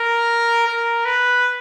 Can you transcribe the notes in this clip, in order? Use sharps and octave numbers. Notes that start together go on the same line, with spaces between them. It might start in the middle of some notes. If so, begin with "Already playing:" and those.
Already playing: A#4
A#4
B4